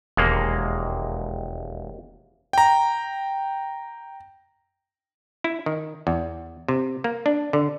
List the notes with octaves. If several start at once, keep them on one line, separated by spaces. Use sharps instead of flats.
E1 D#2 G#3 A#3
G5 A#5
E4
D#3
E2
C3
A#3
D4
D3